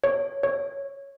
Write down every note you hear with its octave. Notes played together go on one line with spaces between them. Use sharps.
C#5
C#5